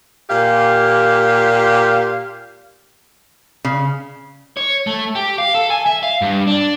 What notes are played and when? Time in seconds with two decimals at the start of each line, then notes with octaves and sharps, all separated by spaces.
0.30 A#2 G4 F5
3.65 C#3
4.57 C#5
4.87 A3
5.15 G4
5.38 F5
5.55 A4
5.70 G#5
5.86 E5
6.03 F5
6.22 G2
6.47 D4